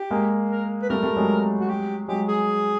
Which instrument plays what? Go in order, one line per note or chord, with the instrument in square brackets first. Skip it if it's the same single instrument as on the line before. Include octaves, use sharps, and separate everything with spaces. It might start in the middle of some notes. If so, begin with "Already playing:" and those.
Already playing: [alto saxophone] G4
[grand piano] G#3 A#3
[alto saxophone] A#4
B4
[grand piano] G3 A3 [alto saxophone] A#4
[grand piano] G3 A3
F#3 G#3
[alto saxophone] F#4
G4
[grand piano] F#3 G#3 [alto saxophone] G4
[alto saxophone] G#4